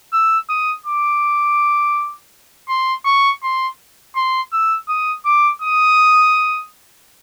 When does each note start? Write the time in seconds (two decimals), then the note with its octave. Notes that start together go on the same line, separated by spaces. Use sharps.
0.13 E6
0.49 D#6
0.86 D6
2.69 C6
3.05 C#6
3.43 C6
4.16 C6
4.52 E6
4.88 D#6
5.25 D6
5.62 D#6